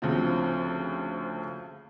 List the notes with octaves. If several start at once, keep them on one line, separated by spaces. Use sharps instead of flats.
D2 C#3 F3 C4